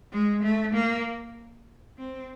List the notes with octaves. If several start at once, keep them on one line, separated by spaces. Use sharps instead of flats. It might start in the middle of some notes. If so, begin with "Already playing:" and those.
G#3
A3
A#3
C4